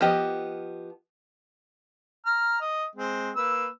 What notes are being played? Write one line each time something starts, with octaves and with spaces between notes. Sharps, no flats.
F3 B3 G4 D#5
A#5 F6
D#5
G#3 C4
A#3 B4 E6